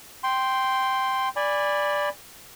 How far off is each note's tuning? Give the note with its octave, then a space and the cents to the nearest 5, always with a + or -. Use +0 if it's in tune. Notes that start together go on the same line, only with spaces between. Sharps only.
G5 -5 C6 +0
D5 +0 G#5 -25 B5 +0